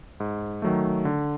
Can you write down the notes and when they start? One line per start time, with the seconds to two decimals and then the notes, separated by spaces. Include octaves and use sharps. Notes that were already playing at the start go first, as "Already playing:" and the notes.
0.20 G#2
0.62 D#3 F#3 A3
1.05 D3